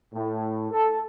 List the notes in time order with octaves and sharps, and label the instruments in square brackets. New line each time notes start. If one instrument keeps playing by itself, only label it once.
[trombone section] A2
A4